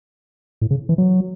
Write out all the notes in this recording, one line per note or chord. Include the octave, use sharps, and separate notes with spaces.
A2
C#3
E3
F#3